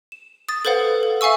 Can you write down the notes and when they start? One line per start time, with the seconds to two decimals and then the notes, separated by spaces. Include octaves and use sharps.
0.12 E7
0.49 D#6 A6
0.65 A4 B4 C5 F5 F#5
1.03 A4
1.21 E5 F5 G#5 C#6 E6